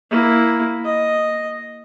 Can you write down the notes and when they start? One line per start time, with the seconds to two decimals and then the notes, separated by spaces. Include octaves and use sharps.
0.11 A#3 E4
0.85 D#5